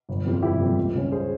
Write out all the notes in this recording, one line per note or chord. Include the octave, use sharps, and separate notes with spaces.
G1
F2 E3 G3
F4
G1 E4 G4
F2 E3 G3
C#2
C#3 G3 C#4
G#4 C5